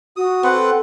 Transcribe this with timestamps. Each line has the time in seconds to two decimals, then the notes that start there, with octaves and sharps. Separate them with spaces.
0.17 F#4 D#6
0.43 C4 A4 B4 F#5